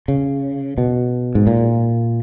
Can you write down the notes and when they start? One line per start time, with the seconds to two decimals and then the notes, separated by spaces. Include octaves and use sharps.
0.08 C#3
0.78 B2
1.35 G#2
1.47 A#2